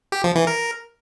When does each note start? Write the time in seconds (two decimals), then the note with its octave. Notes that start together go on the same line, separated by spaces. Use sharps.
0.12 G4
0.24 F3
0.35 E3
0.47 A#4